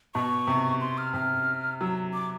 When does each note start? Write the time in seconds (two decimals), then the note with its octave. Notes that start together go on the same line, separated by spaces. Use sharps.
0.15 B2 C#6
0.47 C3
0.81 C6
0.98 F6
1.14 C3 F6
1.80 F#3 E6
2.14 D6